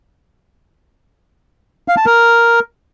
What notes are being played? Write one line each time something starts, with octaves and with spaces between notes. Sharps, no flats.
F5
A5
A#4